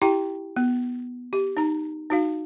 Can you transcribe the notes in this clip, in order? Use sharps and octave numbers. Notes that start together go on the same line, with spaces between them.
E4 G4 G5 A#5
B3
G4
D#4 A#5
D#4 F#4 F5